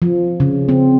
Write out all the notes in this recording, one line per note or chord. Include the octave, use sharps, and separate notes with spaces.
F3
C#3
C4